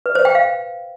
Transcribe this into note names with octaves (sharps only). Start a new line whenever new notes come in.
B4
C5
G5
F5